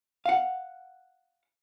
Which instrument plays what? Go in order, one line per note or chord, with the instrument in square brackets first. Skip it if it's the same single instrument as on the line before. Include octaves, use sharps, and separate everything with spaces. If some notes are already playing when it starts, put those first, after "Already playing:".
[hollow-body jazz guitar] F5 F#5